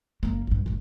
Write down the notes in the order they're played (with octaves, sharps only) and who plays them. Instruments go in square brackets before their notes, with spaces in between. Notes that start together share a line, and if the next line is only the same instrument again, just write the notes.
[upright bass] F#1 A#3
A#1 G2
F#1 A#2